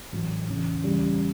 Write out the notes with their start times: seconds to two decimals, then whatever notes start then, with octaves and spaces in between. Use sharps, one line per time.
0.13 A1 A2 F#3
0.48 E2 C#3 E3
0.84 E2 C#3 G3